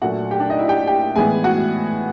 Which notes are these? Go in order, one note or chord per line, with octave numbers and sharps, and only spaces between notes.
A#2 F#3 A3 D4 F#4 F#5
G4 G5
D4 D5
D#4 D#5
E4 E5
G4 G5
G4 G5
A2 E3 G#3 B3 G#4 G#5
F#4 F#5